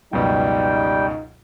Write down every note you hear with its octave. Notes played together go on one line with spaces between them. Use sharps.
C#2 F#2 B2 G3 D#4 G5